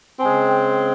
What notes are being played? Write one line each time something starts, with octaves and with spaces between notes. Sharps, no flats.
C#3 G#3 C4 G#5
G5